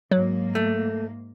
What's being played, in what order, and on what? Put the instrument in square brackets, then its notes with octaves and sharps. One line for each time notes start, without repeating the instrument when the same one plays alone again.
[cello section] G#2 A#3 [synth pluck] F#3
[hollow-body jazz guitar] A3